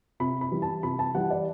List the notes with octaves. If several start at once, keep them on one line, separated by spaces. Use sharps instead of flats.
C3 B5
B5
E3 G3
A5
C3 B5
A5
E3 G3 F#5
D5